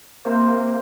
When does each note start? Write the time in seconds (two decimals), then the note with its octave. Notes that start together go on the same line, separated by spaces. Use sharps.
0.25 C3 A#3 C5